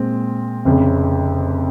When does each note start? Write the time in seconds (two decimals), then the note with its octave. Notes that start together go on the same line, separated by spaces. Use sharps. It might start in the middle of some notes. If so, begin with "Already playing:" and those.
Already playing: A#2 G#3 C4
0.65 F1 F2 C#3